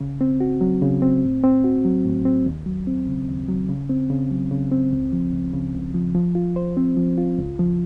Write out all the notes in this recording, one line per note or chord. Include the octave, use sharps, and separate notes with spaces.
C#3
C4
F#4
F#3
C#3
C4
A2
C4
F#4
F#3
A2
C4
D#2
F#3
C4
C#3
D#2
F#3
C#3
C4
C#3
F#3
C#3
C4
C#2
F3
C#2
C#3
C#2
F3
F3
F4
C5
C4
F3
F4
C#2
F3